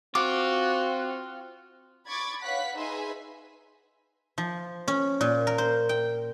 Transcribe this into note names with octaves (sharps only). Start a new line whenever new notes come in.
C4 F4 F#4 D6
B5 C#6 D6 G#6 A6
B4 C#5 F5 F#5 F#6 B6
D#4 G#4 B4 E5 G#5 C6
F3
C#4
A#2
A#4
C5
G5